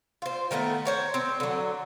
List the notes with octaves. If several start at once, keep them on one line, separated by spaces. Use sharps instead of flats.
F4 C5
D#3 G#3 A3 B3
C5 C#5 A#5
C4
D3 F#3